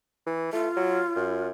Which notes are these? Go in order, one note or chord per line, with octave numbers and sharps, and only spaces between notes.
E3
A3 F4
F#3
F#2